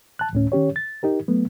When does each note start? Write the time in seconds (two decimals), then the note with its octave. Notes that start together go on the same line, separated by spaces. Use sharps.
0.19 A5 F#6
0.33 D2 A2 C#4
0.52 D#3 C#4 G4 C#5
0.76 A6
1.03 D#4 G4 A#4
1.28 F#3 A3 B3